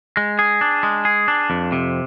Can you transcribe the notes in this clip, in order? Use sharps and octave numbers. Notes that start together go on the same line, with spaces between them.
G#3
G#4
D4
G#3
G#4
D4
F2
C3